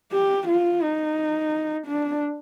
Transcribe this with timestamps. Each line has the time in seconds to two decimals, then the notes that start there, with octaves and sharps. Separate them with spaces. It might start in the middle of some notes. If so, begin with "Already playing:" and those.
0.12 G4
0.48 F4
0.82 D#4
1.86 D4